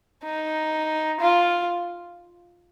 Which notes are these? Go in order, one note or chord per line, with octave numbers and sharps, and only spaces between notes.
D#4
F4